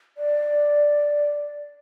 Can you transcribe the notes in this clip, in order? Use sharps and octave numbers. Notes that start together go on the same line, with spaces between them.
D5